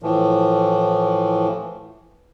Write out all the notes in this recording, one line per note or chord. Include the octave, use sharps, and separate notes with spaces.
A2 E3 F3